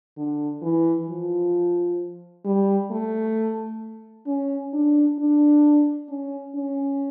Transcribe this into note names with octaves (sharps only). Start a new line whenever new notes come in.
D3
E3
F3
G3
A3
C#4
D4
D4
C#4
C#4